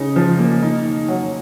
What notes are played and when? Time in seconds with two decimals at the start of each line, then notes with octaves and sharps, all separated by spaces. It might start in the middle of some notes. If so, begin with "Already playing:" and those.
Already playing: C#3 D#4
0.16 F3
0.39 A#3
0.62 D#4
0.85 D#3
1.08 F#3